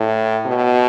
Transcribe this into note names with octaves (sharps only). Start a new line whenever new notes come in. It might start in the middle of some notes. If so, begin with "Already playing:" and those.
Already playing: A2
B2